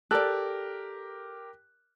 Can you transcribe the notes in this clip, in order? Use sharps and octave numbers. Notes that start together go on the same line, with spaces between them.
G4 A4 A#4 D5 F#6